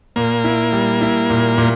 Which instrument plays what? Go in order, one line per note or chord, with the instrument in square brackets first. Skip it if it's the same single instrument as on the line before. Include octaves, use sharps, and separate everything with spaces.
[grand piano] A#2 [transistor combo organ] A#3
[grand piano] E4
G3
E4
A#2
A#2